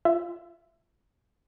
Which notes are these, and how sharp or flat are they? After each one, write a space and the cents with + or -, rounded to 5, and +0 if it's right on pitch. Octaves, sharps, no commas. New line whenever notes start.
F4 -20 E5 +20